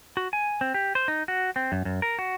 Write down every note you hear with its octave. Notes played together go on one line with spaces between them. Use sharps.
F#4
G#5
C4
G4
C5
D#4
F#4
C4
F#2
F#2
A#4
F#4